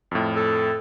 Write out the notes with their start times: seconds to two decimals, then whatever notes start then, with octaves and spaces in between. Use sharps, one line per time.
0.11 F2 A2
0.36 A4